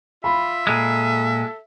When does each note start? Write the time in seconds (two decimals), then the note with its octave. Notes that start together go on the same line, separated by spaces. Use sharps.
0.24 F4 E5 B5
0.67 A#2 G#3 A4